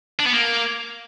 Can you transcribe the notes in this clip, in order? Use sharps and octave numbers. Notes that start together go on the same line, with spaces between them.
D4
B3
A#3